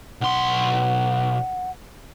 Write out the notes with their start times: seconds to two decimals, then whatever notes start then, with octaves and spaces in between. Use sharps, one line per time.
0.21 B1 F#5 C6